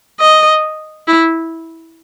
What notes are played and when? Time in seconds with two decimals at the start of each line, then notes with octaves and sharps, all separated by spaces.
0.20 D#5
1.08 E4